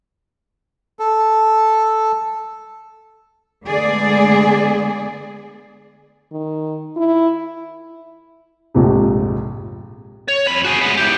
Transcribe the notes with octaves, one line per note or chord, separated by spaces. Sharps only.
A4
D3 G#3 A3 B3 G#4 D5
D#3
E4
A#1 F2 G#2 C3
C#5
F2 B5
F#4 G#4
G#3 B3
E2 G4